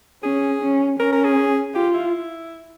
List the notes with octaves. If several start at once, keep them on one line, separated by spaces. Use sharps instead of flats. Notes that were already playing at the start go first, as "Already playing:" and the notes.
C#4 G#4
C#4
C#4 A#4
A#4
G#4
F4 G4
E4